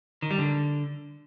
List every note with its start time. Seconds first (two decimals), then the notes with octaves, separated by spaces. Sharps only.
0.22 D#3
0.31 G3
0.39 D3